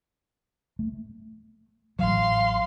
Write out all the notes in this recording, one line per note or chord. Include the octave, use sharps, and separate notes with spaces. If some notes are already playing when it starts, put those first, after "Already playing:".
A3
A1 F#3 F5 C6